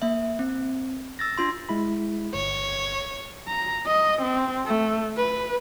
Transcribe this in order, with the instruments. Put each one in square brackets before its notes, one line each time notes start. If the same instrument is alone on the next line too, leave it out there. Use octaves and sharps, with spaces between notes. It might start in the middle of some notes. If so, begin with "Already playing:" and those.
[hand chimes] A#3 E5
C4
E6 A6 A#6
D4 F4 C6
[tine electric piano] G#3 E4 B5
[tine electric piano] G1 [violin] C#5
[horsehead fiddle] A#5
D#5
C4
A3
B4